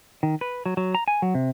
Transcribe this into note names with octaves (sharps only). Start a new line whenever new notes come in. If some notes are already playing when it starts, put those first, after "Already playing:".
D#3
B4
F#3
F#3
A#5
G#5
F#3
C3